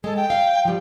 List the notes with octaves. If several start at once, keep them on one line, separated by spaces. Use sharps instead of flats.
G#3 A4
G5
F5
F3 G3